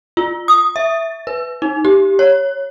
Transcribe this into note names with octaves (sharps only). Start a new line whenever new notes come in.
F4
D#6
E5
B4
D#4
G4
C#5